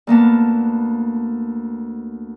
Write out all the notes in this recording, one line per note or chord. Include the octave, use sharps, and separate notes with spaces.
D2 A#3 B3 A5